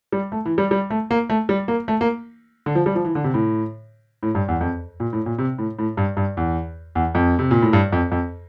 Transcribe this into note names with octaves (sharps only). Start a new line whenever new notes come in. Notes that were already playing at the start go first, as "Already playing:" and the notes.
G3
A3
E3
G3
G3
A3
A#3
A3
G3
A#3
A3
A#3
D3
F3
G3
F3
E3
D3
C3
A2
A2
G2
E2
F2
A#2
A2
A#2
C3
A2
A2
G2
G2
E2
E2
F2
C3
A#2
A2
G2
F2
F2